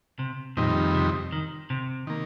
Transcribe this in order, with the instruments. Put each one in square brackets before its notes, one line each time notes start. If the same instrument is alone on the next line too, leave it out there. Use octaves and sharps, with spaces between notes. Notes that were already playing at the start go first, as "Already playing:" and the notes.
[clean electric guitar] C3
[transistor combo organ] F2 D#3 G3 C4 D#4 [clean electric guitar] A#2
[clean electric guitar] C3
D#3
C3
[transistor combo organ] D#3 A#3